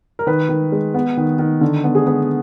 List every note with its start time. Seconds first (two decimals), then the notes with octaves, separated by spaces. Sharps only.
0.19 A#4
0.27 D#3 B4
0.49 D#3
0.72 G#3
0.94 B3
1.17 D#3
1.39 D#3
1.61 D3
1.84 B3
1.95 G#4
2.06 B3